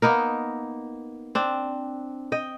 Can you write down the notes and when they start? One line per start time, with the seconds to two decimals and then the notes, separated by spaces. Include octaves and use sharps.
0.02 A#3 B3 D#4 A#4
1.35 C4 D4
2.32 D#5 G5